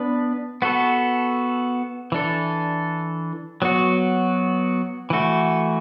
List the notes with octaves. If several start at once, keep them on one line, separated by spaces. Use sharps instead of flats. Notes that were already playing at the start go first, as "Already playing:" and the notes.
Already playing: B3 D4 B4
B3 F#4 A4
E3 D4 A4
F#3 B3 F#4
E3 A3 F#4